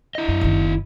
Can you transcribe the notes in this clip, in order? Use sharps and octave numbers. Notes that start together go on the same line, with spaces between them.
E4 D#5
F#2
F#1 D#3